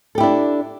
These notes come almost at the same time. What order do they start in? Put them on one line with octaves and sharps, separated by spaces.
A4 G4 E4 D4